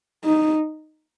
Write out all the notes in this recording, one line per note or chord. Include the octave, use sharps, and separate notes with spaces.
D#4